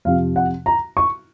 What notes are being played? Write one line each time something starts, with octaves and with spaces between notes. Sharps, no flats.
F2 C3 F3 F5
F#5
A#5
C#6